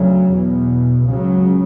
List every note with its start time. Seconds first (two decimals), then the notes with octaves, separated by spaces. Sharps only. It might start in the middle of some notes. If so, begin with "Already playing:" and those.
Already playing: D2 C#3 F#3
0.31 E2 B2
1.06 C#2 C#3 F#3